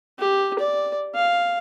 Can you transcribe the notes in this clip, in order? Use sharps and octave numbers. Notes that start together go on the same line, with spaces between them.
G4
D5
F5